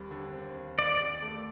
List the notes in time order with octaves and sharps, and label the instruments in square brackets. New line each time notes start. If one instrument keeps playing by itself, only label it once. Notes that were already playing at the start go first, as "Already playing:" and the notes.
Already playing: [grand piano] D#2 G3 C4
D3
C4
D#2
[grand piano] D#2 [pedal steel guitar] D5
[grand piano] D#2
A3